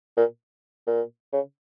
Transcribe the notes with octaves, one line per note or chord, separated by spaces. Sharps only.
A#2
A#2
C#3